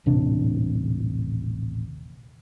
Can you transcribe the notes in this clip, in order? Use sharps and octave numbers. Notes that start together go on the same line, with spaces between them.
D#1 A1 C3 D4